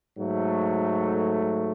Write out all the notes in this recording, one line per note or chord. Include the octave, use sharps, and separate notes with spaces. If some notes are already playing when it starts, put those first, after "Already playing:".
G#2 F#3 A3